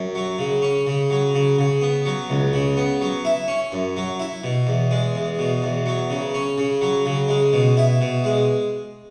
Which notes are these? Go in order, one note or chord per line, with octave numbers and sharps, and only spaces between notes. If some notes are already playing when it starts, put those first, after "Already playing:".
Already playing: F#2
F#3
C#3
C#4
C#3
F#3
C#3
C#3
B3
F#3
C#2
C#3
B3
F#3
E4
C#4
F#2
F#3
E4
B2
E2
G#3
E2
B2
E2
F#3
C#3
C#4
C#3
F#3
C#3
G#3
B2
E4
B2
G#3